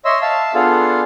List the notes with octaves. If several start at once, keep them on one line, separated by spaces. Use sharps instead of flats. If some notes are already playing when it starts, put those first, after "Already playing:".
C#5 D#5 E5 C6 E6
E5 F5 A5 E6
B3 D4 F4 G#4 A4 F5